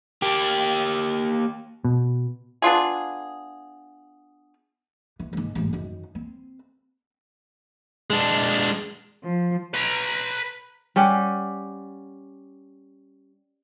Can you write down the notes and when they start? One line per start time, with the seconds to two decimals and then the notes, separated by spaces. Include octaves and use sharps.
0.22 A#3 G4
1.85 B2
2.62 B3 D4 F4 G#4
5.19 E3
5.33 G#2 D#3
5.55 A1 G#2
5.73 F#2 D#3
6.15 C4
8.10 G#3 D4
9.23 F3
9.74 B4 A#5
10.96 G3 C#4 G4 F#5